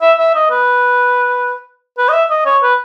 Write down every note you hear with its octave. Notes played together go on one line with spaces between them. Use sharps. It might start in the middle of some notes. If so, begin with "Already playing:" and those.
E5
E5
D#5
B4
B4
D#5
E5
D#5
C#5
B4